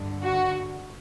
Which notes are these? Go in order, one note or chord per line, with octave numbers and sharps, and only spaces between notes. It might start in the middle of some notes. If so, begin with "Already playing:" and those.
Already playing: G2 D3
F#4